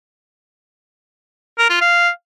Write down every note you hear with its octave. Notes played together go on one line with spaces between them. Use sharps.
A#4
F4
F5